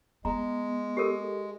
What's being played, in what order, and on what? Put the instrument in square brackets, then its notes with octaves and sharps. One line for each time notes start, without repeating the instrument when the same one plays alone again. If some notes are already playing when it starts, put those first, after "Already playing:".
[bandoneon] G#3 [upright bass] B3 [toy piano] A#5
[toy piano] G4 A4 A#4